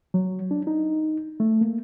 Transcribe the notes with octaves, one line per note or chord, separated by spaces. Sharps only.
F#3
D4
D#4
A3
A#3